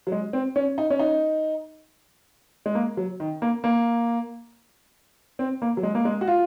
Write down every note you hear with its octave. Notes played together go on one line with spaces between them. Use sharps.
F#3
G#3
C4
C#4
D#4
C#4
D#4
G#3
A#3
F#3
D#3
A#3
A#3
C4
A#3
F#3
G#3
A#3
G#3
F#4
F4